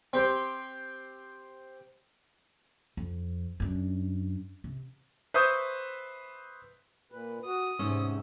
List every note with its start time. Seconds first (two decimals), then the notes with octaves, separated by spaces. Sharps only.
0.13 C4 G4 C5
2.97 F2
3.60 F#2 D4
4.64 C3
5.34 B4 C5 E5 C#6 D#6 G6
7.12 A#2 B4
7.46 F#4 D#6
7.79 E2 G#2 C3 C#4 E5